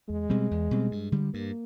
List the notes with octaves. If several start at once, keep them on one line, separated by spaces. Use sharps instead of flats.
E2 G#3
B2 G3 C4
E2
B2 G3 C4
G2
D3 G3
G2 A#3